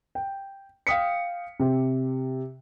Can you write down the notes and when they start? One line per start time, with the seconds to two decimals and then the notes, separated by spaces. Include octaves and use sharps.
0.15 G5
0.87 F5 G5 D#6 B6 C#7
1.60 C3